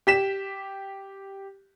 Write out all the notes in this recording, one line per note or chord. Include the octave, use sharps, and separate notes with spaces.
G4 B6 E7